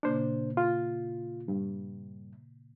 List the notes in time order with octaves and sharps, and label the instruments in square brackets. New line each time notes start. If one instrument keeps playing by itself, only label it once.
[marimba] A#2 C#3 A#3 [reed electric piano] D4 C5
[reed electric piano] F4
G2